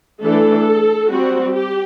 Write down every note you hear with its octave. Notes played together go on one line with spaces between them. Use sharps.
E3 A3 D4 A4
G3 C4 F#4
G4